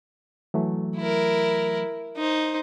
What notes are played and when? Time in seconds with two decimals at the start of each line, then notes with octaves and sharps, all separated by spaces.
0.54 E3 F#3 A3
0.96 E4 A#4
2.17 D#4 C5